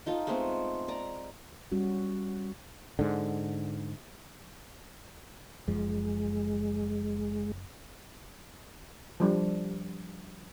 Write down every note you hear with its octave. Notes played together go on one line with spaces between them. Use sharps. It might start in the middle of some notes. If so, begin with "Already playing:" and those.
D#4 F4 A4
G#3 A3 B3 C4
D5 A#5
G3 C#4 F#4
G#2 D3
F#1 F#2 F3 G#3
F3 G3 D4